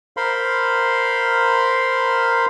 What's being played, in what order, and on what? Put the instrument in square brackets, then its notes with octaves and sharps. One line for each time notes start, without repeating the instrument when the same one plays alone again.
[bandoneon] A#4 C5 F5 B5 C6